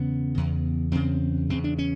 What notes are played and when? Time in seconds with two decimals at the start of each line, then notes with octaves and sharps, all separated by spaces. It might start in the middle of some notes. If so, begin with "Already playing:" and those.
Already playing: E2 C#3 B3
0.35 E2 C#3
0.92 E2 C#3 C4
1.50 E2 C#3 C4
1.64 D4
1.78 C#4